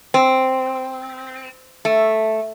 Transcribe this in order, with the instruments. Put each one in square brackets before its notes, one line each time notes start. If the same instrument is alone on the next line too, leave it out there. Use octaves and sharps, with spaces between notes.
[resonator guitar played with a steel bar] C4
A3